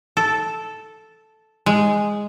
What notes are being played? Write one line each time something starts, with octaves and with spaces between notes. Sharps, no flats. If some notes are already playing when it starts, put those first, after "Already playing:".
A4
G#3